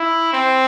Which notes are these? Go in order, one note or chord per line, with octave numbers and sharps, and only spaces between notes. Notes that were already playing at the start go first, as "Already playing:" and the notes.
Already playing: E4
C4